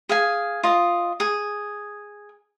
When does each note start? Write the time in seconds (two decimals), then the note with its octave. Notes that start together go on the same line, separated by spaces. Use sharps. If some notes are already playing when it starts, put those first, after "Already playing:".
0.09 G#4 F5 G#5
0.63 F4 D#5
1.20 G#4